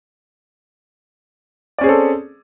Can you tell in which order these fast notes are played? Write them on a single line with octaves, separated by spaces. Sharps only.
D5 C#4 G#4 C4 A4